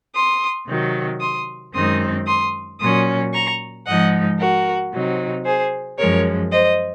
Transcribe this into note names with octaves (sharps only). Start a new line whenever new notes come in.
C6 D#6
C3 D#3 F#3
C6 D#6
F#2 D#3 G#3 C4 D#4 C6 D#6
C6 D#6
A#2 F#3 C#4 C6 D#6
A#5 C#6
G#2 F3 G#3 D#4 D#5 F#5
F#4 A#4
C3 F#3 C4 D#4
G#4 C5
F#2 F3 G#3 A#4 C#5
C5 D#5